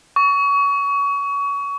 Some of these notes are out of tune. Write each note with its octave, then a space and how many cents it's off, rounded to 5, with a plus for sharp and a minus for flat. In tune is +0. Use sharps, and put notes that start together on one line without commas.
C#6 +30